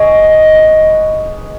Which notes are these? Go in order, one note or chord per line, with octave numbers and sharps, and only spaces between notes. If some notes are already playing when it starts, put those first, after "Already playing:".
Already playing: G#3 B3 D#4 G#4 C#5
B4 D#5
B4 D#5